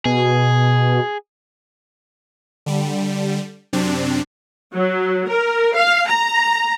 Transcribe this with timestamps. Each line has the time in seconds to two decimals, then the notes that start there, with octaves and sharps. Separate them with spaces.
0.05 B2 G#4
2.66 D3 G3
3.73 F#2 C3 C4 D4
4.75 F#3
5.28 A#4
5.76 F5
6.07 A#5